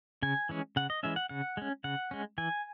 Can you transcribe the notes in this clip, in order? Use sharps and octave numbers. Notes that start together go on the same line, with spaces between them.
C#3 G#5
E3 G#3 C#4
C#3 F#5
D#5
E3 G#3 C#4 E5
F#5
C#3 F#5
G#3 C#4
C#3 F#5
G#3 C#4
E3 G#5